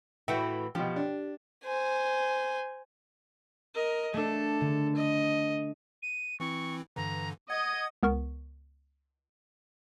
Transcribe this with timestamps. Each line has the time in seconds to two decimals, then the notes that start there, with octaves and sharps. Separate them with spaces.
0.28 A2 E3 F#4 E5 G5
0.75 B2 F3 G4
0.96 D4
1.64 C5 G#5
3.74 A#4 D#5
4.14 A3 D4 A4
4.61 D3
4.96 D#5
6.02 D#7
6.40 E3 C4 E4 C#6
6.96 G2 D3 E3 A#5
7.50 D#5 F#5 G#6
8.03 C#2 B3 A#4 C#6